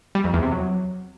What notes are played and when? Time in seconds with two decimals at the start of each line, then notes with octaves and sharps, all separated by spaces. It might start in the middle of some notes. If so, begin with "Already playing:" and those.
0.15 G3
0.24 F2
0.33 E2
0.42 C3
0.52 F#3